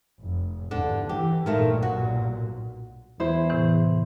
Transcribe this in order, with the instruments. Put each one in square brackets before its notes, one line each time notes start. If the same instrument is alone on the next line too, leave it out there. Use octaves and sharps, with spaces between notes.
[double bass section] F1
[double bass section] E2 G2 [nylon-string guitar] D3 D4
[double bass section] E3 [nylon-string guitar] G4
[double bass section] B1 G2 A#2 [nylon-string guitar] D#3 A3 F4
[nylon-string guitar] F#4
[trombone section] E2 [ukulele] E4 C5
[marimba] A2 C3 E3